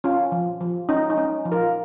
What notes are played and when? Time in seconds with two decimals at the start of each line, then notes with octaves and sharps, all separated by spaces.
0.04 C#4 F4
0.32 F3
0.61 F3
0.89 C#4 D#4
1.10 D#4
1.17 C#4
1.45 F3
1.52 F4 A#4